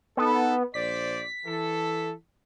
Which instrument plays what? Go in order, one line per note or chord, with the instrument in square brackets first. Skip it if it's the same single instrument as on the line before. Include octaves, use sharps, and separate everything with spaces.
[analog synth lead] B3 [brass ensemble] D#4 A4
[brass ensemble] A#1 C5 D5 [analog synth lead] B6
[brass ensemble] E3 A4